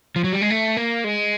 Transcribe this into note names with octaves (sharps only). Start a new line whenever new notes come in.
F3
F#3
G3
G#3
A3
A#3
G#3